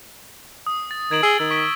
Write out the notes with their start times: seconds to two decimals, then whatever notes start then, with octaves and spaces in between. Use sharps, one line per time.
0.67 D#6
0.91 A6
1.11 D#3 G#6 D7 F#7
1.23 G#4 E6 G7
1.40 D#3 E6
1.51 C#6 B6 D7